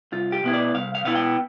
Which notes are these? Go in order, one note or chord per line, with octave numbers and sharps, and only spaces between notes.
C2 F4
G4
B2 B3 E4
D5
C2 F5
F5
B2 B3 E4 F5
G5